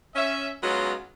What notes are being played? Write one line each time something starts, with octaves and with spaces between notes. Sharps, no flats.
C#4 E5
F#3 G#3 B3 C#4 D#4 F4